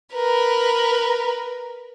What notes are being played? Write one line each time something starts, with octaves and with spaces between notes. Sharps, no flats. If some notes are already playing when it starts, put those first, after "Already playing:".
A#4 B4